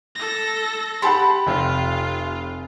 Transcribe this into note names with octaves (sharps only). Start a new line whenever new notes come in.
A4 A#6
G4 F#5 A5 B5 C6
F1 F4